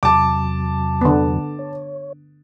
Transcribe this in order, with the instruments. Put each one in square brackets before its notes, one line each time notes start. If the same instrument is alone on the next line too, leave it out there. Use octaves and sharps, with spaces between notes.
[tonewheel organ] E2 C3 F#3 [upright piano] A5 D6
[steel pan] D3 B3
[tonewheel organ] C#5